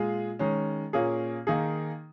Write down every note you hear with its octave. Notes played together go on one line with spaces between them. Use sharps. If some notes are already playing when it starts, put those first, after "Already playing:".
Already playing: A#2 G#3 F4 G#4
D#3 G#3 C#4
A#2 A#3 C#4 G#4
D#3 A#3 D#4 G#4